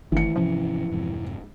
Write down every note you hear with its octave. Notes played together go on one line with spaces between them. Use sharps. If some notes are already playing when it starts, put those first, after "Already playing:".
G1 D#3 E3 A3 C#7
G#2 C3 F3 C#4
F2 G#2 C3